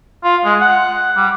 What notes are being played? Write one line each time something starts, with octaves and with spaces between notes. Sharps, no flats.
F4
G#3
F#5
G3